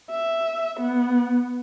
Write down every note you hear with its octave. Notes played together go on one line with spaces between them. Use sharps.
E5
B3